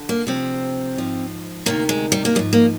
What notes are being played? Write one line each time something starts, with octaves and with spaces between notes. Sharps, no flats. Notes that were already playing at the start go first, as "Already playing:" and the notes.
Already playing: D3
A#3
D2 C3 F3 C4
G#2 F3
D2 C3 D#3 A#3
G#3
G3
A#3
G#2 F3 G#3
A#3